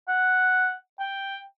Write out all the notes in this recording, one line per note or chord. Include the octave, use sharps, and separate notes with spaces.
F#5
G5